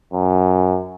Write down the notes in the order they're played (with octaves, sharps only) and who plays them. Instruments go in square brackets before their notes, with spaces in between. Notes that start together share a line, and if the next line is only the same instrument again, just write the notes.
[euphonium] F#2